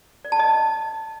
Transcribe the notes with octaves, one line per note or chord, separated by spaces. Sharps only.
D5
A5
D#5